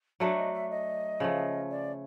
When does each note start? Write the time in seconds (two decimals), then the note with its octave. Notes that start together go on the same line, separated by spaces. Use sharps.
0.20 F#3 A3 D4 C#5
0.37 D#5
0.53 E5
0.70 D#5
1.20 C#3 F3 A3
1.71 D5